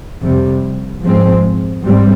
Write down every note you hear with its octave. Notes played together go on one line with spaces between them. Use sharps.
F2 C3 G3
G#2 F3 G#3 C4
G#2 G3 C4